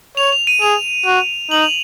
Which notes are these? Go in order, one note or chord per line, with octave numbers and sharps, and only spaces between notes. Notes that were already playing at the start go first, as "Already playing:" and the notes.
C#5 F7
F7
D#7
G#4 F7
F#4
D#4 F#7
F7